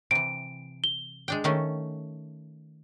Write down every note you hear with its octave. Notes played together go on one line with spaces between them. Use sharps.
C3 E3 D7
G7
G#3 D4 G5
D#3 A3 C#4